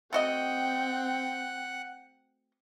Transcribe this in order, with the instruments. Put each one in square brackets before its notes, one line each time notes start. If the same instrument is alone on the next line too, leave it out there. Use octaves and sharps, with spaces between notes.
[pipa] A3 F#4 D#5 [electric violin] C4 G5 [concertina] F#5